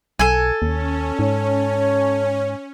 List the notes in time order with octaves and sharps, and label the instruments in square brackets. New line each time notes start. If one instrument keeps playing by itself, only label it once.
[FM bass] B1 [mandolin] A4 G#5
[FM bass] D#2 [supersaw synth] C#4
[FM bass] G#2 [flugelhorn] C#5